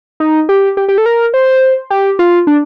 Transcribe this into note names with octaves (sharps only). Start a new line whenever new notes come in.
D#4
G4
G4
G4
A4
A#4
C5
G4
F4
D4